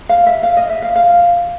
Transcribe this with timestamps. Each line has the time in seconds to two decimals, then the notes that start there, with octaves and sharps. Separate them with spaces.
0.09 F5
0.27 E5
0.43 F5
0.57 D#5
0.70 E5
0.82 F5
0.96 F5